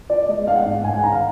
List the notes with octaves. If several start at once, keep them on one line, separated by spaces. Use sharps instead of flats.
F4 D5
G#3 D#5
G#3 F5
F#5
G#2
F#5
G#3 G#5
F#5
D#3 A#5
F5